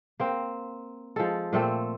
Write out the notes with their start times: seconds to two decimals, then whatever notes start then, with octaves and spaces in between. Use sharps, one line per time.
0.20 A#3 C4
1.16 F3 G#3 A4
1.53 A#2 A3 C4 A4